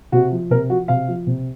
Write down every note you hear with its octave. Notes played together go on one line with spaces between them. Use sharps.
C3 F#4
F3
C3 A#4
F3 F#4
C3 F5
F3
C3